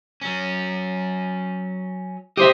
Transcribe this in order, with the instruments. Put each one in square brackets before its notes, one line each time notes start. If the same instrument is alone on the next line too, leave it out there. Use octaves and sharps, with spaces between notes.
[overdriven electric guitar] F#3 C#4
[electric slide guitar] G4 C5 E5 [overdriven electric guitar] D#5